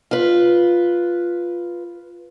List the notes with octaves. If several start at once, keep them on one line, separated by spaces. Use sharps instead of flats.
F4 B4